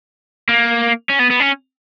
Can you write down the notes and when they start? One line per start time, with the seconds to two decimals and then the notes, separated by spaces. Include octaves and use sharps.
0.49 A#3
1.10 C#4
1.20 B3
1.31 B3
1.40 C#4